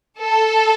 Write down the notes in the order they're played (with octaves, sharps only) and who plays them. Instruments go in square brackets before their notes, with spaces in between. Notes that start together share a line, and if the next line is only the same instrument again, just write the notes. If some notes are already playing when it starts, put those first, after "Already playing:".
[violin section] A4